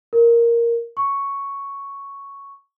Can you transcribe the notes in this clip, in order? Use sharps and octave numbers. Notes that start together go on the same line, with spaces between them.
A#4
C#6